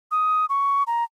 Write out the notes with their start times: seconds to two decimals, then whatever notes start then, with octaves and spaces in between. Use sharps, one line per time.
0.11 D#6
0.49 C#6
0.87 A#5